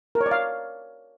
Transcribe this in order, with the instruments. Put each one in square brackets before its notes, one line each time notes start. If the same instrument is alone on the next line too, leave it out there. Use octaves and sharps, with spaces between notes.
[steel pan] A#4
C#5
D5
F5